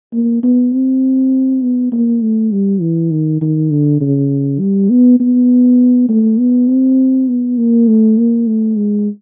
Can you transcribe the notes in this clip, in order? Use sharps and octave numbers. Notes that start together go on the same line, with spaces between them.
A#3
B3
C4
B3
A#3
A3
G3
E3
D#3
D#3
D3
C#3
G3
B3
B3
A3
B3
C4
B3
A#3
A3
A#3
A3
G#3